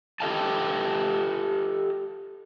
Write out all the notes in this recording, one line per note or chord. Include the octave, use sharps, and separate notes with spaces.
G4 A4 D#5 F5 G5 A5